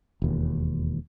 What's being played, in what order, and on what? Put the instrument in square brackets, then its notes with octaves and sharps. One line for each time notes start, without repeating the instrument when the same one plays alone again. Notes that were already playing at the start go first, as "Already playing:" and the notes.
[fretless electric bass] E1 D#2